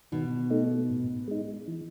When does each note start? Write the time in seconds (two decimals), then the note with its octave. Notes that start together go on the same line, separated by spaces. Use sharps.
0.12 B2 D#3
0.50 A3 D#4
0.90 A2
1.28 G#3 D#4
1.68 E3